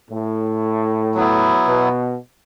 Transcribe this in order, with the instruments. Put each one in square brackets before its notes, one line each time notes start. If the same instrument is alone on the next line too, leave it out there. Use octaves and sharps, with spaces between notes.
[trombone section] A2
[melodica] F#3 B3 E4
[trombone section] B2